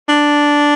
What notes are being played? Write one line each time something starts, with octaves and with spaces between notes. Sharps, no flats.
D4